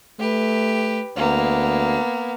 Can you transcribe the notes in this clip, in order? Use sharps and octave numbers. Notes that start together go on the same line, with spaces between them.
A3 G4 B4
D2 A#3 B3